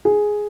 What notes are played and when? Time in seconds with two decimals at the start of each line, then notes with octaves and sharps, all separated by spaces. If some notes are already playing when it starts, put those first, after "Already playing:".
0.05 G#4